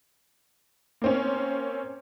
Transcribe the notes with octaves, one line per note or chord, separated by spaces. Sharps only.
A#3 C4 C#4